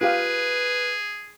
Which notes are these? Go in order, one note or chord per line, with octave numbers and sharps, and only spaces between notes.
F4 G4 G#4 B4 F5